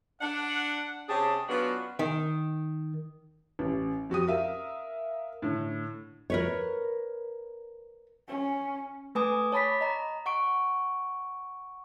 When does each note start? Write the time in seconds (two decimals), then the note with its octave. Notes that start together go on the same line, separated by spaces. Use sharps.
0.21 D4 F#5
1.08 C3 C#4 G4 G#4 A5
1.48 F#3 B3 C#4 D4 F4 F#4
1.99 D#3
3.59 A1
4.10 F2 F#4 G4 D#6
4.27 A#4 E5 F5
5.42 A2 D3
6.30 A#4 B4 C#5
8.28 C#4
9.15 A3 B4 G#5 D6 D#6
9.52 C#5 A5 B5 D6 B6
9.81 D#5 A#5
10.26 F#5 C#6 D7